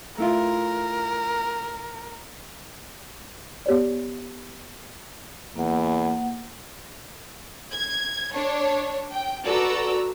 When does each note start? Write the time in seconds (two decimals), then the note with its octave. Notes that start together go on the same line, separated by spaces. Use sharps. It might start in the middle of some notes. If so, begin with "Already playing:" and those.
0.18 A3 E4 F4 A#4
3.66 B3 G4 C#5 D5
5.56 E2 A#3 F#5
7.72 G#6
8.34 D4 C#5
9.13 G5
9.45 F#4 A4 B4 D5 A#5 E6